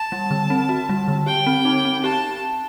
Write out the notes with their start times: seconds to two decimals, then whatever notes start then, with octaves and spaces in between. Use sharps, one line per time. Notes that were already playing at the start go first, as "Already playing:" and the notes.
Already playing: A5
0.12 G3
0.31 D3
0.50 C4
0.69 F#4
0.89 G3
1.08 D3
1.26 G4 G5
1.47 C4
1.65 D#4
1.85 C4
2.04 G4 A5